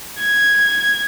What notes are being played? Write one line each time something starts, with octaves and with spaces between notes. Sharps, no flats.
G#6